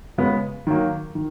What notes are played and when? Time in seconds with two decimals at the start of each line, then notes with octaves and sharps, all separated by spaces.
0.18 C#3 G#3 B3
0.67 D#3 F#3 A#3
1.15 D#3